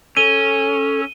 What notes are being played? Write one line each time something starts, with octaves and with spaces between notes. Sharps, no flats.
C#4 A4 D#7 G7